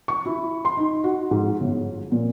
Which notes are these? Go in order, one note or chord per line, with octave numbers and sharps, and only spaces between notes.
C#6
E4
C6
D#4
F#4
G#2
G1
A#2